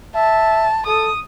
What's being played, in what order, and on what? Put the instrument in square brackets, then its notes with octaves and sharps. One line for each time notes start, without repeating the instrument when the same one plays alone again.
[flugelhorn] E5 [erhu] A5
[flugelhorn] A4 [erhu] D#6